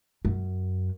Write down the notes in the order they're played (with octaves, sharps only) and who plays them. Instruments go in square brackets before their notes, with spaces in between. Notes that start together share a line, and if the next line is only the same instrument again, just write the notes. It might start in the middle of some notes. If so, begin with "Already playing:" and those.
[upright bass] F#2